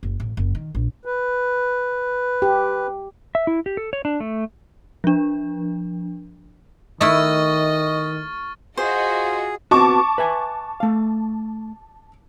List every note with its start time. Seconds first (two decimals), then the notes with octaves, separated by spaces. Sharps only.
0.03 F#1
0.20 A1
0.37 F#1
0.55 D#3
0.75 A#1
1.05 B4
2.42 G4
3.35 E5
3.47 E4
3.66 G4
3.77 A4
3.93 C#5
4.05 D4
4.20 A3
5.04 F3 D4
7.01 D#3 A3 E4 D#5 C#6 F6 A6
8.78 F4 F#4 G#4 C5 D#5
9.71 B3 C4 F#4 A5 C#6 D6
10.18 B4 E5 G#5
10.80 A3 F5